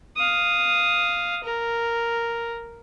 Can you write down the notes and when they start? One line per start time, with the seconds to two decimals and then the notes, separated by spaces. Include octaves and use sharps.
0.16 F5 D#6
1.44 A#4